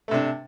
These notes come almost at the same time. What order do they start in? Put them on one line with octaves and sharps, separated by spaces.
A3 C3 D4